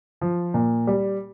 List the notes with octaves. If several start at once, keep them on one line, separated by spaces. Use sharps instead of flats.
F3
A#2
G3